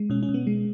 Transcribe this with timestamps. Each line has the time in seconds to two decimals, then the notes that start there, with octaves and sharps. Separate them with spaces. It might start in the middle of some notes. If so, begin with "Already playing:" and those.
Already playing: G#3
0.10 B2 C#4
0.23 C#4
0.29 B2
0.34 B3
0.47 G#3